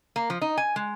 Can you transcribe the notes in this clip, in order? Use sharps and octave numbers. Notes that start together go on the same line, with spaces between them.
A#3
F3
D#4
G#5
G#3